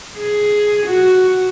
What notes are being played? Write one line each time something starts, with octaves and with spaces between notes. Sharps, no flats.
G#4
F#4